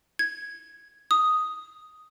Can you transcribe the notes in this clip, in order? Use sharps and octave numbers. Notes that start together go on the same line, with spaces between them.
G#6
D#6